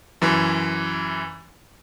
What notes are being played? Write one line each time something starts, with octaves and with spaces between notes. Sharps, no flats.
F#2 E3